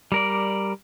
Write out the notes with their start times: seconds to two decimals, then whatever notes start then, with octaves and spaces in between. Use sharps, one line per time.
0.12 G3 A#4 D5